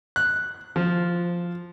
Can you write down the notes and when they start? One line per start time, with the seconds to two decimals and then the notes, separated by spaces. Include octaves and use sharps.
0.16 F#6
0.76 F3